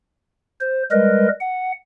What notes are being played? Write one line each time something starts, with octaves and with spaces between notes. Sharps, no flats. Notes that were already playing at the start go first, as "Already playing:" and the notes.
C5
G3 G#3 A#4 B4 D#5
F#5